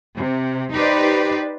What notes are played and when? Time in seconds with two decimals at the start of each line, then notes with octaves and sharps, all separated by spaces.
0.17 C3
0.73 D#4 G4 B4 C5 D5